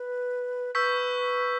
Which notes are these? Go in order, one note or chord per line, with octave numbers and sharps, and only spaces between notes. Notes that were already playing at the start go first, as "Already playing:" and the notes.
Already playing: B4
B4 C#6 E6 G6 B6